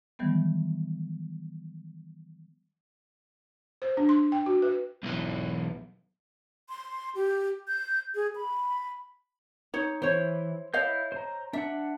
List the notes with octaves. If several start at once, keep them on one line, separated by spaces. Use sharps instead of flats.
D#3 E3 F#3 G3 A3 B3
C5
D4
C6
G5
F#4
B4
B1 E3
C6
G4
G6
G#4
B5
D#4 C#5
E3 C5 C#5
E4 C#5 D#5 F5 G6
C5 A#5
D4 E5 F#5